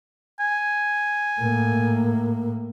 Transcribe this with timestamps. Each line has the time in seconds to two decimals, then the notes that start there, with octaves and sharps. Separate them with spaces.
0.40 G#5
1.40 A2 A#3